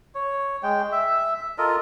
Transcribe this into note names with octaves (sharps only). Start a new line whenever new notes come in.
C#5
G#3 G5
E5
F4 A4 A#4 D#5